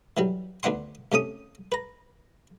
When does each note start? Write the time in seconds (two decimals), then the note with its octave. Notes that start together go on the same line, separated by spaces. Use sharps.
0.17 E3 F#3 G3
0.63 D2 B3 D4 F#5 C6
1.12 C3 A3 C#4 D#6
1.72 B4 A#5